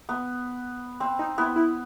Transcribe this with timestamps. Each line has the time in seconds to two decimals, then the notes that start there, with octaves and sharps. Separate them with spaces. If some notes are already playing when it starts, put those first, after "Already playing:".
0.09 B3
1.00 C4
1.19 D#4
1.38 B3 E4
1.56 E4